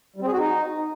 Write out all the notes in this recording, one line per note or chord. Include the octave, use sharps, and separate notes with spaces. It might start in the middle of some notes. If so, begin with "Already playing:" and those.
G3
C4
G#4
F#4
D#4